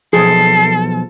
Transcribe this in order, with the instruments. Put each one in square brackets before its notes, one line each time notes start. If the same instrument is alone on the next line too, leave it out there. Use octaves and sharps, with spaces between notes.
[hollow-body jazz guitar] B1 F3 [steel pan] G#4 [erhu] A4 [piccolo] C7